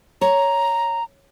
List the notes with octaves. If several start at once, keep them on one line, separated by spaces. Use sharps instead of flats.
C#5 A#5